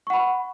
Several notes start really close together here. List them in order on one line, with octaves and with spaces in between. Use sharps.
C#6 F#5 B5